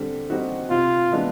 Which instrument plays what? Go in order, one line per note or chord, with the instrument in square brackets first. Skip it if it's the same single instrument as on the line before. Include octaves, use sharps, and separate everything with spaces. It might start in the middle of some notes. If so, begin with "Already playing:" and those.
Already playing: [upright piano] D3 G3 C4
G3 C4 D#4 F#4
[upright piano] C3 [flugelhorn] F4
[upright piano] E3 G#3 B3 D4